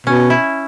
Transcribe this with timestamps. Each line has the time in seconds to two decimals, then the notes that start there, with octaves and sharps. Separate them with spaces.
0.06 B2 C#4
0.30 E4